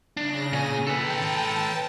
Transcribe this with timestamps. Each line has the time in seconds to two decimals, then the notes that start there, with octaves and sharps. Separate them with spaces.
0.17 C#3 D4 A#6
0.53 A#2 G#5
0.87 A4 B4 G5 A5